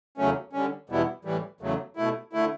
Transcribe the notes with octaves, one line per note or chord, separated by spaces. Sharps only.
E2 C#3 F#3 A3 C#4
D3 G3 C#4
E2 B2 G3 B3 E4
A2 E3 G3
E2 C#3 F#3 A3
B2 A3 E4
D3 A3 E4